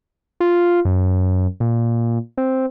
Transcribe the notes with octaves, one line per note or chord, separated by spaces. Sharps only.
F4
F#2
A#2
C4